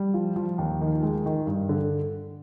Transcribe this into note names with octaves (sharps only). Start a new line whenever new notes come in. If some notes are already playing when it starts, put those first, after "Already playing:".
Already playing: G3
F3
F3
D#2
D#3
G#3
D#3
G2
D3